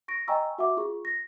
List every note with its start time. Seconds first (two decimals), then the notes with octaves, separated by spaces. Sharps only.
0.08 C#6 A#6 D7
0.28 D#5 G5 G#5 A#5 C#6 E6
0.58 F#4 E5 F#5 D6
0.77 F4 G#4 C#6
1.05 A#6